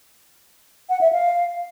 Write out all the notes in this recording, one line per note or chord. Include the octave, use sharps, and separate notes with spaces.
F#5
E5
F5